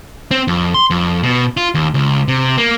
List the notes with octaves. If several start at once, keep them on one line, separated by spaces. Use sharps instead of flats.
C4
F2
C6
F2
B2
F4
D#2
C#2
C3
A#3